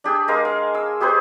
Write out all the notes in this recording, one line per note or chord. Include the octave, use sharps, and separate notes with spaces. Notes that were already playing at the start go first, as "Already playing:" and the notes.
D4 G4 G#4
G#3 A#4 F5
F5
E6
G4 G#4 B4 C5